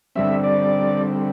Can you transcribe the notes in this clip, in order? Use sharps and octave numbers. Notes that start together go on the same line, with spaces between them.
D3 G3 C4 E5
D5